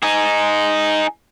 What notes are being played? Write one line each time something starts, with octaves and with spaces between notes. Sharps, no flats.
D#4 G#4